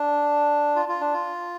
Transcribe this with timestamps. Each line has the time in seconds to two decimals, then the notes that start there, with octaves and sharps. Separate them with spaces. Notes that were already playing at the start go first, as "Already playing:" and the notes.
Already playing: D4
0.76 F4
0.89 F4
1.01 D4
1.14 F4